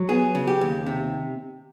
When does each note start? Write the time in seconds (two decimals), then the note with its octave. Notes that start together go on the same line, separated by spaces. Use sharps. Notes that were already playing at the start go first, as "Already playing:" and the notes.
Already playing: F#3
0.09 B3 G#4
0.35 C#3
0.47 G4
0.61 D#2
0.86 C3